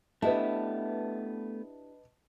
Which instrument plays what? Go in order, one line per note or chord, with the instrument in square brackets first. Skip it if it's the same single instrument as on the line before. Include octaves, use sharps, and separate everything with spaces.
[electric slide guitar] A3 B3 [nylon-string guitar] D4 E4 G4 [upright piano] B4 D#5 A5